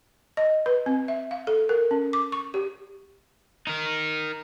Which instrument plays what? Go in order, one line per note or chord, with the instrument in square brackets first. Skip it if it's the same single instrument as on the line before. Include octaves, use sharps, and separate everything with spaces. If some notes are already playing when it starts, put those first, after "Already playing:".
[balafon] D#5
B4
C4
E5
F5
A4
A#4
C#4
D6
C#6
G4
[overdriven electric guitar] D#4 A#4